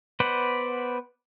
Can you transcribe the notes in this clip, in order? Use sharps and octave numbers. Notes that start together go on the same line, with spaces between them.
B3 B4 C5 D5 F#5